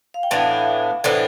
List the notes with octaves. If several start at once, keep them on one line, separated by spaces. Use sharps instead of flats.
F5
G5
A2 E3 B3 D4 F5 A5
A2 E3 B3 D4 A4 C5